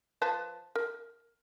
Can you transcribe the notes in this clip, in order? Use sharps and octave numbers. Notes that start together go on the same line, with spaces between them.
F3 B4 A5
A#4